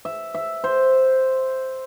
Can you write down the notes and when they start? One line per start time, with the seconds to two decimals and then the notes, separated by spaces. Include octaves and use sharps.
0.05 E5
0.35 E5
0.64 C5